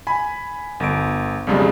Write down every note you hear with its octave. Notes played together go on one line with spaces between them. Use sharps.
G#5 B5
G1 D7
B1 F2 C#3 G3 G#3